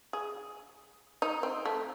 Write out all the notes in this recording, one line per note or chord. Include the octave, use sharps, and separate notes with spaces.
G#4
D#4
C4
A3